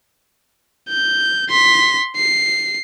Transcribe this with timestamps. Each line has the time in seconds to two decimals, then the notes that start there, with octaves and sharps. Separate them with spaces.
0.89 G6
1.50 C6 B6
2.17 C7